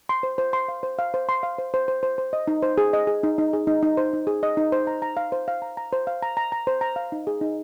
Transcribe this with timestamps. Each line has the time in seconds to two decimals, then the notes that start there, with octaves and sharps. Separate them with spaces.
0.09 C6
0.23 C5
0.38 C5
0.53 C6
0.68 F5
0.83 C5
0.99 F5
1.14 C5
1.29 C6
1.43 F5
1.58 C5
1.74 C5
1.88 C5
2.03 C5
2.18 C5
2.33 D#5
2.48 D#4
2.62 C5
2.78 G#4
2.93 D#5
3.07 G#4
3.23 D#4
3.38 D#4
3.53 G#4
3.67 D#4
3.83 D#4
3.97 C5
4.13 D#4
4.27 G#4
4.43 D#5
4.57 D#4
4.72 C5
4.87 A#5
5.02 A#5
5.17 F5
5.32 C5
5.48 F5
5.62 A#5
5.77 A#5
5.93 C5
6.07 F5
6.22 A#5
6.37 A#5
6.52 A#5
6.67 C5
6.81 A#5
6.96 F5
7.12 D#4
7.27 G#4
7.41 D#4